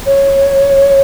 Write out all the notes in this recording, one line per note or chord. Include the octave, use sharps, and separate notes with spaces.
C#5